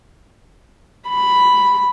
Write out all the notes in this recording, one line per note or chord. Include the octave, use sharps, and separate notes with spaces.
B5